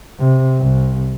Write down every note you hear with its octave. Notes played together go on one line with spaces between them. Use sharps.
C3
C2